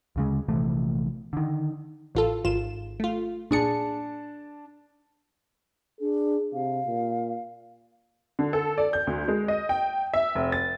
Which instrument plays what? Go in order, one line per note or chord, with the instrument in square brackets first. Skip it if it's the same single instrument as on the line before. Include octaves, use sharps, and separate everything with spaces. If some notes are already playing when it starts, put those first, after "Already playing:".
[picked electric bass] D2 C#3 G#3
A#1 C3 E3 A3
D3 D#3
[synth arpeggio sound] A1 F4 A4
G#1 F4 E7
A3 F4
[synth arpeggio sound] A#2 G#4 C#7 [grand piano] D4 A5
[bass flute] D4 [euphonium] G#4
[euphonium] C3 [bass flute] F5
[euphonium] A#2
[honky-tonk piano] D3
A4
D5
G6
D2
G#3
D#5
G5
E5
F1
A6